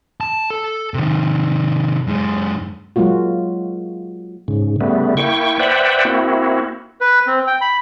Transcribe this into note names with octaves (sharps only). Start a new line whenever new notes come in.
A5
A4
C3 D#3
F#2 G#3
F#3 G#3 A#3 F4 F#4
G#2 C#3
C#3 G3 A3 B3
A#3 E4 G5 C#6
B4 C5 D5 E5 F#5 G5
A#3 C4 E4 F#4
B4
C4
G5
B5